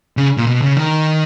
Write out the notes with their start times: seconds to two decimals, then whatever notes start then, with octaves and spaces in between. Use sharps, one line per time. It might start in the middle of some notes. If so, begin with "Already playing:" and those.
0.17 C#3
0.37 A#2
0.47 B2
0.62 C#3
0.76 D#3